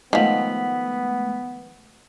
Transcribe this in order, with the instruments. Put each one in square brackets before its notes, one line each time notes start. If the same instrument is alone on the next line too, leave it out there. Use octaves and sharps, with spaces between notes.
[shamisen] D#3 F3 [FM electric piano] G#3 A3 [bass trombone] B3 [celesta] F#5 B6 F#7